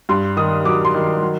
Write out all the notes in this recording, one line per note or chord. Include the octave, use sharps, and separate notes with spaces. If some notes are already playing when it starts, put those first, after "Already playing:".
G2 C6
D#3 D#6
F#3 D6
C6
D#3
F#3